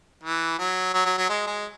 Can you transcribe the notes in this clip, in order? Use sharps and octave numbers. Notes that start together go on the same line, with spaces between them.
E3
F#3
F#3
F#3
F#3
G#3
G#3